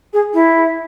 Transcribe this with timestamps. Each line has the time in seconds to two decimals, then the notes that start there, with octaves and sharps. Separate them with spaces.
0.13 G#4
0.34 E4